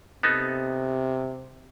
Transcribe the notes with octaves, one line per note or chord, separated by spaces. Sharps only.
C3 B3 D#4 A4